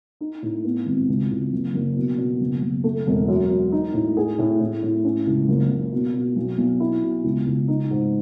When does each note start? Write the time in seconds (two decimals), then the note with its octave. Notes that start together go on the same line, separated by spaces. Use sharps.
0.21 D#4
0.42 A2
0.64 B3
0.86 G#1
1.08 C#2
1.31 C#2
1.53 F#1
1.74 F#1
1.96 B2
2.18 B2
2.41 F#1
2.62 F#1
2.84 A3
3.07 E1
3.28 F#2
3.50 F#2
3.72 D#4
3.94 A2
4.17 G#4
4.39 A2
4.60 A2
4.83 A2
5.05 C#4
5.27 C#2
5.48 F#1
5.70 F#1
5.92 B2
6.14 B2
6.36 B1
6.58 B1
6.80 E4
7.03 B2
7.24 C#2
7.47 C#2
7.68 D#4
7.91 G#2